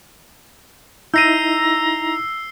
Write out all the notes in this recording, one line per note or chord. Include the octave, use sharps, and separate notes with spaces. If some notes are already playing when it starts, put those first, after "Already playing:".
D#4 E4 A#5 E6 G6 A#6 C7 D#7